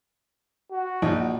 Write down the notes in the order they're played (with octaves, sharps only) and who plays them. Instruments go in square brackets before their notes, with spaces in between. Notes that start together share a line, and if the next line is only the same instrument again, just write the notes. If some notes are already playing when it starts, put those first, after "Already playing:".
[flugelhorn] F#4
[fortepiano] A#1 D#4